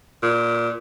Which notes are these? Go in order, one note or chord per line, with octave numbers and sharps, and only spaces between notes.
A#2